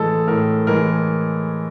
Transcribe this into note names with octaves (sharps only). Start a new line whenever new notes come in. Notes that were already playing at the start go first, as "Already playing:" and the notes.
Already playing: A2 E3 G#3 G#4 A4
A2 A#4
E3 G#3 A#4